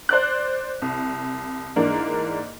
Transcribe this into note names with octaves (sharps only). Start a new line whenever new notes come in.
C5 D5 F#6
C2
G#2 E3 A#3 D4